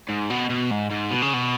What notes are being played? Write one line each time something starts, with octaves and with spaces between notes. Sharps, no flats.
G#2
B2
B2
G#2
G#2
B2
C#3
B2